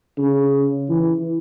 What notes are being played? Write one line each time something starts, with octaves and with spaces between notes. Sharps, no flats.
C#3
E3